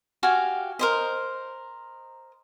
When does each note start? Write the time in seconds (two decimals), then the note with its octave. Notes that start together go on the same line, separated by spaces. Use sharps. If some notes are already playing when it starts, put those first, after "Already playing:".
0.23 F#4 G4 F5 G#5
0.79 A#4 C5 D#5